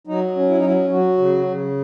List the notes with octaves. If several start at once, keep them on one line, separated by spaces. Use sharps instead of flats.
F#3 D#4
C#4
E4
D#4
F#3 E4
F#3 F#4
C#3
C#3